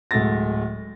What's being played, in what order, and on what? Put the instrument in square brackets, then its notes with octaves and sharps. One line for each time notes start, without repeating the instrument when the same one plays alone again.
[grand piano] D1 G#3 A3 F#4 A6 A#6